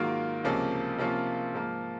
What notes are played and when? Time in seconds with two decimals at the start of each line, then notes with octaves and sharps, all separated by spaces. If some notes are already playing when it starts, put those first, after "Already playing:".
Already playing: G#2 D#3 F#3 A#3 F4
0.44 C#2 C3 F3 A#3 C#4
0.98 C3 F3 A#3 C#4 F4
1.54 G#2 F3 A#3